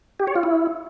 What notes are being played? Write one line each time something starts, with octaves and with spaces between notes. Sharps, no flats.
G4
C#5
F4
E4